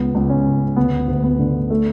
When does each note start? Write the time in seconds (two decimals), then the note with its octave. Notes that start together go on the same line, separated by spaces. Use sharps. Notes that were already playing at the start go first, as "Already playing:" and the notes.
Already playing: C#2 B3
0.15 C#2
0.30 C#4
0.46 C#3
0.76 D2 B3
1.08 D2
1.24 B3
1.39 D3
1.70 A3